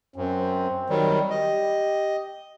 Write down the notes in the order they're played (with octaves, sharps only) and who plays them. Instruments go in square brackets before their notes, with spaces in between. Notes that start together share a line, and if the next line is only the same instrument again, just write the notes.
[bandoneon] F#2 [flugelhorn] C4
[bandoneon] D#3 F#3 G3
[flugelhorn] G4 [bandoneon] D#5